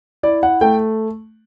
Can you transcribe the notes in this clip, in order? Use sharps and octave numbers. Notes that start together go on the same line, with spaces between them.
E4 D5
F#5
A3 G5